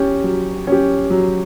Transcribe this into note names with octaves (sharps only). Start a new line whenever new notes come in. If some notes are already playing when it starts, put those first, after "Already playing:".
Already playing: C#4 G4
F#3
C#4 G4
F#3